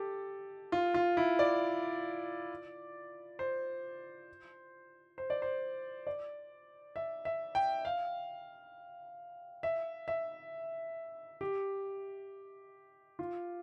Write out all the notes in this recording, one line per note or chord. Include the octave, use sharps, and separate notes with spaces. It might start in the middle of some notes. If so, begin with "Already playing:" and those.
Already playing: G4 A4
F4
F4
E4
D5
C5
C5
D5
C5
D5
E5
E5
G5
F5
E5
E5
G4
F4